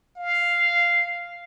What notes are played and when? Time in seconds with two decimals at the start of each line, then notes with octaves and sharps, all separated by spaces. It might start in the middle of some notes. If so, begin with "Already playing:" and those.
0.16 F5